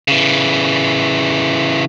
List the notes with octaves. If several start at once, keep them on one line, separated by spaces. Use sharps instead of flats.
C#3 E3